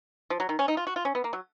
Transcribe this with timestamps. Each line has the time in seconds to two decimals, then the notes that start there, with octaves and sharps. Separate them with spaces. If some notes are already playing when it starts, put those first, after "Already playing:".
0.30 F3
0.40 F#3
0.49 D#3
0.59 C#4
0.68 D#4
0.77 F4
0.87 F#4
0.96 F4
1.05 C#4
1.15 B3
1.24 A#3
1.33 F#3